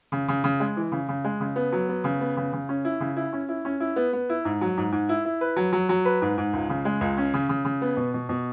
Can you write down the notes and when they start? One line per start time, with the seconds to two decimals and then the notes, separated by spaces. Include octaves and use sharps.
0.12 C#3
0.28 C#3
0.44 C#3
0.60 G#3
0.77 E3
0.92 C#3
1.08 C#3
1.24 G#3
1.40 C#3
1.56 B3
1.72 F#3
1.89 B3
2.04 C#3
2.20 B3
2.37 C#3
2.53 C#3
2.69 C#4
2.85 E4
3.00 C#3
3.16 E4
3.33 C#4
3.49 E4
3.65 C#4
3.80 E4
3.96 B3
4.13 B3
4.29 E4
4.45 G#2
4.61 F#3
4.77 G#2
4.92 G#2
5.09 E4
5.25 E4
5.41 B4
5.56 F#3
5.73 F#3
5.89 F#3
6.05 B4
6.22 G#2
6.38 G#2
6.53 C#2
6.69 C#3
6.85 G#3
7.01 C#2
7.17 C#4
7.34 C#3
7.49 C#3
7.65 C#3
7.82 B3
7.97 B2
8.14 B2
8.29 B2